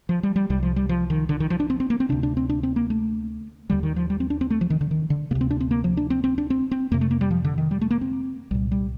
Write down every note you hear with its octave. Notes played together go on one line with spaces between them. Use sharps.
F3
G3
G3
C2 C3 G3
F3
G3
F3
D#3
D3
D#3
F3
D4
C4
C4
A#3
C4
D2 C3 D4
D4
C4
D4
C4
A#3
A3
D#2 D3 G3
D#3
F3
G3
C4
D4
C4
A3
F3
D#3
D3
D#3
D3
D2 C3 A#3
C4
D4
C4
A#3
F3
D4
C4
C4
D4
C4
C4
F2 C3 A#3
A3
A#3
G3
F3
D3
D#3
G3
A3
A#3
C4
C2 A#2 G3
G3